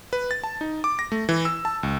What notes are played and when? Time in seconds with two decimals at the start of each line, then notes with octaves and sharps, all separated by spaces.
0.13 B4
0.31 A6
0.44 A5
0.61 D#4
0.84 D6
0.99 A#6
1.12 A3
1.29 E3
1.45 E6
1.65 A5
1.83 C#2